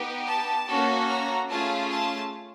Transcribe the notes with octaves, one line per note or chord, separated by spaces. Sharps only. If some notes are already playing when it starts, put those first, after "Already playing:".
Already playing: B3 D#4 G4
A5
A#3 C#4 F#4 A4
A#5
A3 C#4 F4 G#4 A5
A5